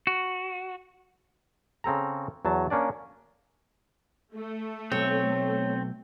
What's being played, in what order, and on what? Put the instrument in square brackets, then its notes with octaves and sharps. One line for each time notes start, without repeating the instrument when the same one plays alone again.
[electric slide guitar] F#4
[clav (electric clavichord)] C#3 C4 A4 A#5
E2 F#3 A5
A#3 C#4 D4 D5
[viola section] A3
[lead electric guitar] B1 [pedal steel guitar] C4 [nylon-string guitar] C#5